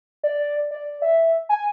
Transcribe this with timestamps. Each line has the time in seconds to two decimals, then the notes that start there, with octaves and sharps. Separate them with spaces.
0.24 D5
0.71 D5
1.02 E5
1.49 G#5